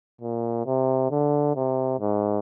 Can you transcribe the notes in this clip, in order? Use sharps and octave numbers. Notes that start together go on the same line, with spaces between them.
A#2
C3
D3
C3
G#2